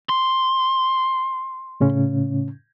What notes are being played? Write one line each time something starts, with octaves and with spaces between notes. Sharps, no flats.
C6
A2 C#3 C#4